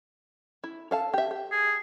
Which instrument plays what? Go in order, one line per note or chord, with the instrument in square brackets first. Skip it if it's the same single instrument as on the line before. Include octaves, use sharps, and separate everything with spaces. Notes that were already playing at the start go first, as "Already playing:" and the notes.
[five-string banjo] E4
A4 F5 A5
G4 E5
G4
[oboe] G#4